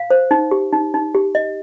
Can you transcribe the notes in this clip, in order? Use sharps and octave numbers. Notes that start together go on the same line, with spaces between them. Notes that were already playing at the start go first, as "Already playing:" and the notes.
Already playing: F5
C5
D#4
G4
D#4
D#4
G4
D#5